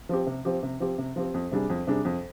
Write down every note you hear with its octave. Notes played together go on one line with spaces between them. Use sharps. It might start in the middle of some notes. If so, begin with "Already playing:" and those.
F3 C4 G4
C3
F3 C4 G4
C3
F3 C4 G4
C3
F3 C4 G4
F2
C3 G3 D4 G#4
F2
C3 G3 D4 G#4
F2